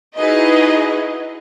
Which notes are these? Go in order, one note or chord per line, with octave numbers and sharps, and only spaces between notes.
D#4 E4 F#4 G#4 B4 D#5